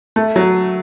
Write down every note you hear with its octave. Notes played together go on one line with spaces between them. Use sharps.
A3
F#3